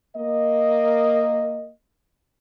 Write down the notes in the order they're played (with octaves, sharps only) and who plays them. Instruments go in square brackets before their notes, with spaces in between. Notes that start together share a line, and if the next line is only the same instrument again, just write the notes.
[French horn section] A#3 D#5